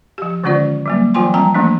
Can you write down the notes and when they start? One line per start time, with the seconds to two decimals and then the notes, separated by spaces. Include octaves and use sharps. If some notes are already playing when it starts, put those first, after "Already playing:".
0.18 F3 G4
0.44 D3 D#3 G#3 C#4 F4 D5
0.86 F#3 G3 A#3
1.14 E3 F#3 F4 G5 G#5 C6
1.34 F3 G3 C4 G5 A5 A#5
1.54 E3 F3 A3 A#3 C4 D4